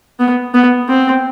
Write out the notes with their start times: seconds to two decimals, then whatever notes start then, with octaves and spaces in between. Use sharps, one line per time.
0.20 B3
0.54 B3
0.88 C4